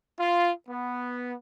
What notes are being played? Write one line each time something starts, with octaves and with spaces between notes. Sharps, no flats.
F4
B3